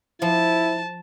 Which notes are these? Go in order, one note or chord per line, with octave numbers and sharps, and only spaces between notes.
F3 E4 A5